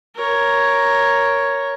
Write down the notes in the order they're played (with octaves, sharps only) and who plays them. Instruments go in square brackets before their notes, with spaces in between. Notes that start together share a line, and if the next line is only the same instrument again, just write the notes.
[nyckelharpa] A#4 C#5